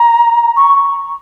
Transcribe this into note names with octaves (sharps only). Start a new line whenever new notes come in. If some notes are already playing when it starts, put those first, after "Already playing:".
Already playing: A#5
C#6